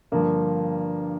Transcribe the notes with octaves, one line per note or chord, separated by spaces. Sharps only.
G2 D3 F3 A#3